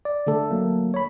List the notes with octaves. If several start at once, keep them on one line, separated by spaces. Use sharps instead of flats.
D5
D3 A3 A4
F#3 A#3
C#5 B5